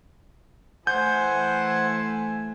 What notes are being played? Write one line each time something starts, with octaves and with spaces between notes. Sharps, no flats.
E3 A3 C5 F#5 G#5 G6